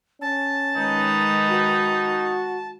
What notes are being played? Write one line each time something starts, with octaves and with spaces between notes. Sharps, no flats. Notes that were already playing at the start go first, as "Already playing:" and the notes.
C#4 A5
D#3 G#3 D#4 B4
F#4